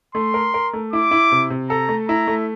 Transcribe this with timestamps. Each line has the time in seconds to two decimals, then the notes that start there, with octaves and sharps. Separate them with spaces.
0.15 A3 C6
0.34 A#4
0.54 A#4
0.73 A3
0.93 E4 D6
1.11 E4
1.32 C3
1.50 C3
1.70 A4 A#5
1.89 A3
2.08 E4 A#5
2.27 A3